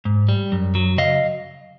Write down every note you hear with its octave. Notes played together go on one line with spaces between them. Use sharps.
G#2
G3
F#2
F#3
C#3 D#5 F5